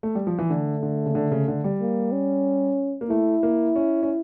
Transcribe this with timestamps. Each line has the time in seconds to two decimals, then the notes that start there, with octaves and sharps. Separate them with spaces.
0.03 A3
0.15 G3
0.27 F3
0.39 E3
0.50 D3 A3
0.83 D3
1.06 C#3
1.15 D3
1.31 C#3
1.48 D3
1.64 G3
1.80 A#3
2.12 C#4
3.01 A#3
3.10 A3 E4
3.43 A#3
3.76 C#4
4.03 C#4